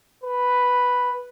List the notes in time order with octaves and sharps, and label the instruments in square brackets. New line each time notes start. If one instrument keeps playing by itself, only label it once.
[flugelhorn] B4